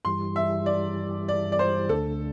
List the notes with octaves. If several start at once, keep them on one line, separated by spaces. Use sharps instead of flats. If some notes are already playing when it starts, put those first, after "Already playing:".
G2 E3 G3 C6
E5
D5
D5
D5
C5
D2 D3 A3 A4